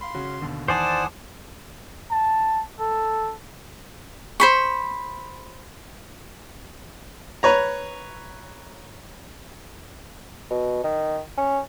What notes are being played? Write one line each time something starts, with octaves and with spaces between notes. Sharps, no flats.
F5 B5 C6
C#3 C#4 F#4
D#2 B2 D3
E2 D#3 C5 D5 F#5 G#5 A5 D#6
A5
A4
C5 B5 C#6
B4 C#5 A#5
B2
D#3
C#4